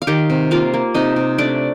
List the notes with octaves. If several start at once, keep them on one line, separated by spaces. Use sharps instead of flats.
F5
D#3 G4 G5
C3
A#3 F4 F5
A#3
C3 D#4 D#5
C3
A3 D4 D5